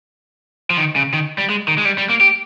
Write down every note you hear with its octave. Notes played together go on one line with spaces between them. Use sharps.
F3
D#3
C#3
D#3
G3
G#3
D#3
G#3
G3
G3
A#3
G4